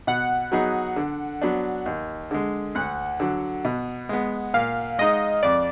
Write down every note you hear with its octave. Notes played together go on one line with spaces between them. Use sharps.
B2 F#5
F#3 B3 D#4 G#4
D3
F#3 B3 D4
D#2
D3 G#3
D2 F#5
D3 F#3
B2
G#3 B3
A#2 F5
G#3 D#4 D#5
F2 D5